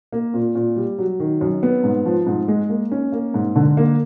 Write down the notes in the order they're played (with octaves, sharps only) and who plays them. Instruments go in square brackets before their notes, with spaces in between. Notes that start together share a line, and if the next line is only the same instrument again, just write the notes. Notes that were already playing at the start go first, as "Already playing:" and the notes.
[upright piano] A#3
A#2
A#2
G3
F#3
D#3
F#2
B3
G#2
F3
G#2
G#3
A#3
C#4
A#3
G#2
D3
A#3